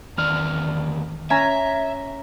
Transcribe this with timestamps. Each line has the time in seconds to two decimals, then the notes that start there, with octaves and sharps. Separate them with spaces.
0.18 E2 D#3 D5 F6
1.30 C#4 E5 G#5 A#5